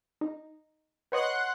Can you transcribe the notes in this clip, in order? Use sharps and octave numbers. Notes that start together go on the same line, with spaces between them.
D#4
B4 C#5 D#5 F#5 C6 F#6